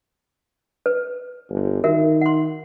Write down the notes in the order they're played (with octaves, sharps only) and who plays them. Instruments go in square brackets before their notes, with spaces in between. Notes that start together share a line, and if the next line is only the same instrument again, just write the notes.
[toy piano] B4
[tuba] G1
[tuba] D#3 [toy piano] F#4 A#4 E5
[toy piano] F#5 C6